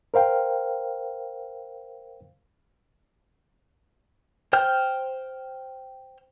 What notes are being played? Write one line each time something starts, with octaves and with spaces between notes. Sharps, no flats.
A#4 C5 F5 G5
C5 G5 F6 G6